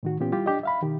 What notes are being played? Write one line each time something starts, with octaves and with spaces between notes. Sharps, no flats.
A2 D#3 F#4
A#2 E3 B3 C#4 F4 G4
G3 E4 F4 G4
D4 G4 D#5
E5 F5 B5
B2 D#3 G4